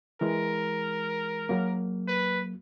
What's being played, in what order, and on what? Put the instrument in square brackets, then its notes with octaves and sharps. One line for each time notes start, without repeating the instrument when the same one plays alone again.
[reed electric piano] E3 G#3 [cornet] A#4
[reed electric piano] F#3 A#3
[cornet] B4